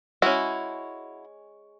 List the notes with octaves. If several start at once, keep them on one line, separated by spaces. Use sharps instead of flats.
G#3 C#4 E4 F#4